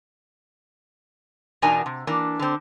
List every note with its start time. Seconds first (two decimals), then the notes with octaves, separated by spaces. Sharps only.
1.62 E2 B2 D4 D#4 A#4 G#5
1.86 C3
2.07 E3 A#3 D4
2.39 D3 C4